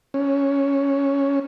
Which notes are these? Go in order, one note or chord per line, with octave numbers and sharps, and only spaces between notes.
C#4